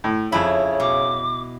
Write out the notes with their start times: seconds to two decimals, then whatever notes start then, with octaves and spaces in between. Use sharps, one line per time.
0.04 A2
0.32 F2 C#3 E4 C#5 B5
0.80 B2 D6